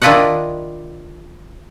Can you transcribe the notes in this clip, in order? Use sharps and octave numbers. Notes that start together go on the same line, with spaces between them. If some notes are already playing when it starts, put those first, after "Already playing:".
D#3 D4 E4 F4 D#5 F#5